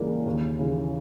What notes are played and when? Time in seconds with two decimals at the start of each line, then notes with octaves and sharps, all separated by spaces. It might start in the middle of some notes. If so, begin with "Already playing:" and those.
Already playing: C#2 C#3 E3 G3 A#3
0.26 D#2
0.59 C#3 E3